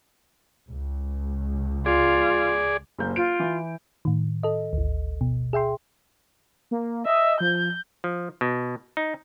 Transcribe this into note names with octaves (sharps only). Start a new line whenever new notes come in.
C#2
F4 G#4 D5
F#1 A#3 G6
F4 D7
E3
A2 D#3
A4 D#5
G#1 D2
B2
G#4 E5 G5 C6
A#3
D#5 E5
F3 G6
F3
B2
D#4